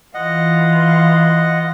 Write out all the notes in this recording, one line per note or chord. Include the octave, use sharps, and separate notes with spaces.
E3 F4 D#5 F#5